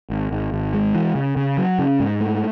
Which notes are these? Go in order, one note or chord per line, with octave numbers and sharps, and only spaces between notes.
G#1
G#1
G#1
G#3
E3
C#3
C#3
F#3
C#3
G#2
A3